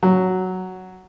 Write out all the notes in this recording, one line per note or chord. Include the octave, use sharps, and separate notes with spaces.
F#3